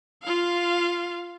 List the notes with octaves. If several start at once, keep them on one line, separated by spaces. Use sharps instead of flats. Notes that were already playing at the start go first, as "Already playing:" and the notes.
F4 F5